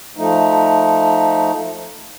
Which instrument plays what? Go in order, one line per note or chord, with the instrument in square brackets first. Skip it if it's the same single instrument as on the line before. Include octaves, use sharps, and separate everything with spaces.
[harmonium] F3 A3 D#4